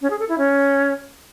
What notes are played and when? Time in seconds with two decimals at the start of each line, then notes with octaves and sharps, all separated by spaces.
0.01 C#4
0.10 G#4
0.19 A4
0.29 E4
0.38 C#4